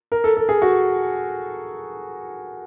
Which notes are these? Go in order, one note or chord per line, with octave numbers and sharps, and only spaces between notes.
A#4
A4
A4
G#4
F#4